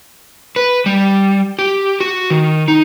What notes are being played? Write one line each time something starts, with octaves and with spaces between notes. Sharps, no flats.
B4
G3
G4
F#4
D#3
D#4